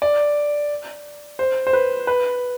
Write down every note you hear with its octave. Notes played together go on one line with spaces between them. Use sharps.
D5
C5
C5
B4
B4